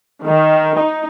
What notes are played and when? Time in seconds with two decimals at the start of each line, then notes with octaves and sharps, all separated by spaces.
0.23 D#3
0.76 D#4